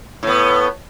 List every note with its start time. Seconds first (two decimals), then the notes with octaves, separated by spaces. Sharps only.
0.23 A2 B3